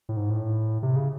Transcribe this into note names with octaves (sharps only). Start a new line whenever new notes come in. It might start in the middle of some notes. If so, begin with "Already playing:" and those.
A2
G#2
A2
C3
C#3